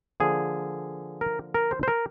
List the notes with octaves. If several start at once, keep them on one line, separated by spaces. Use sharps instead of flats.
D3 F3 A#3 G#4
A#4
A#4
C5
C5
A#4